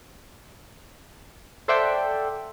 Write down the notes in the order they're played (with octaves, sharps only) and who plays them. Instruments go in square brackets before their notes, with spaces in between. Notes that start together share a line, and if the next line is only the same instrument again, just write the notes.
[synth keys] A4 C5 D5 E5 F#5 G5